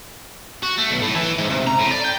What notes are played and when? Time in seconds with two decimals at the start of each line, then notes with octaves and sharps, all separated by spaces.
0.63 F#4
0.78 A3
0.91 B1
1.02 A2
1.15 E3
1.38 G#2
1.50 C3
1.67 A#5
1.80 A2
1.91 D5
2.05 G5